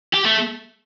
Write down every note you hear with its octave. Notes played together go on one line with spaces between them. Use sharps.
G4
A3